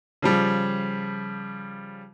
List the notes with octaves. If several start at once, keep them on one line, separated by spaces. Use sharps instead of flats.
C#3 F3 G3